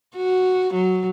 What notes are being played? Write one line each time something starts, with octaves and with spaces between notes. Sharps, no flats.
F#4
F#3